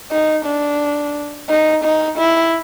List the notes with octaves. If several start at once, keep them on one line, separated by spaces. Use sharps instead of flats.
D#4
D4
D#4
D#4
E4